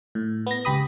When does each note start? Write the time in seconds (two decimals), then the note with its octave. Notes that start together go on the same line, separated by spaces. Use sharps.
0.15 A2
0.47 B3 A#6
0.65 C#2 G4 B5 D#6